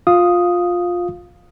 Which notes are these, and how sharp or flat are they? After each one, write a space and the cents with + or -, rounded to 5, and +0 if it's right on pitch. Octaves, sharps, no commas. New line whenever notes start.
F4 +15 F5 +0 D#6 +0